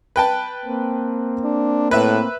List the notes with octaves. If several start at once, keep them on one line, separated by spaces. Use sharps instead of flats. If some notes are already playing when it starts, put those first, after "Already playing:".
B4 G5 A5
A#3 C4
D4
A2 B4 E5